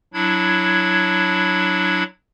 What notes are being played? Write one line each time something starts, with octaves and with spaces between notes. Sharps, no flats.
F#3 D4 E4 G#6